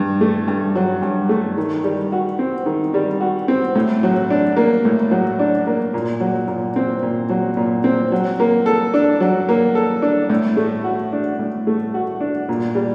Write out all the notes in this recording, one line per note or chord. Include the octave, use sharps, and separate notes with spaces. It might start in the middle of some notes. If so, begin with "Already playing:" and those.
Already playing: G2
A3
G2
F#3
G2
A3
D#3
G3
F#4
C4
D#3
G3
F#4
C4
A2
F#3
D4
A#3
A2
F#3
D4
A#3
A#2
F#3
A#2
C4
A#2
F#3
A#2
C4
F#3
A#3
A4
D4
F#3
A#3
A4
D4
A2
A3
F#4
D4
A2
A3
F#4
D4
A#2
G3